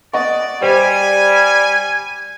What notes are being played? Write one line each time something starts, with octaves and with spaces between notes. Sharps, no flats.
D5 D#5 F#5 C#6
G3 C5 G#5